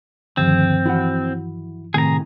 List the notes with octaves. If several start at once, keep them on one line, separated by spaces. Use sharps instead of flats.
D2 G2 D#3 F3 C4
E3 E4 F#4 F#5
A2 C3 D#3 G#4 A#5